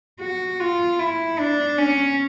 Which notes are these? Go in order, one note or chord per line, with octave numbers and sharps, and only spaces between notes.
F#4
F4
E4
D4
C#4